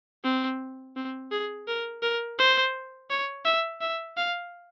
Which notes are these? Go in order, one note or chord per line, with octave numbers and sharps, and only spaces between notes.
C4
C4
G#4
A#4
A#4
C5
C#5
E5
E5
F5